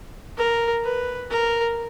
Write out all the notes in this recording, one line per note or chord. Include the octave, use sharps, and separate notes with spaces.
A#4
B4
A#4